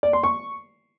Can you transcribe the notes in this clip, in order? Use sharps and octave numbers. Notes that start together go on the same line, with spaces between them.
D5
C6
C#6